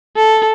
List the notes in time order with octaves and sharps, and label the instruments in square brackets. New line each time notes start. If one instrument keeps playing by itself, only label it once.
[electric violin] A4